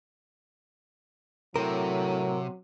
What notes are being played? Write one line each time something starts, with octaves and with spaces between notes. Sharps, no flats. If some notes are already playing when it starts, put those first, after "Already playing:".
A2 C3 F#3 A#4